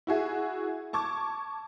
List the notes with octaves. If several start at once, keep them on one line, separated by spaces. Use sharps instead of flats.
E4 F#4 G#4 E5
A5 C#6 D6 G#6